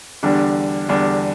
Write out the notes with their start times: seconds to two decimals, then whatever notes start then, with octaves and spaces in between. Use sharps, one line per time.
0.23 E2 D3 G3 D4
0.89 E2 D3 G3 D4